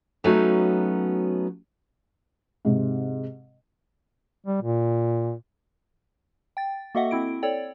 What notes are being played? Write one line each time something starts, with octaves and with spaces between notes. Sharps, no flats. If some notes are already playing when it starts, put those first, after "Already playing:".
F#3 A3 B3 C#4 D#4 F#4
G#2 C3
G3
A#2
G5 A6
A#3 F#4 A4 D#5 E5 F#5
C4 E4 D7
A4 C#5 D5 G5